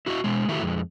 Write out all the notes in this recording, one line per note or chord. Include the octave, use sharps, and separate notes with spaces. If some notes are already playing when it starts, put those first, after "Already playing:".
E4 F#4 A#4 D#5 E5
B2 G#3
D#3 A3 E4 F#4 G4
F2 G#3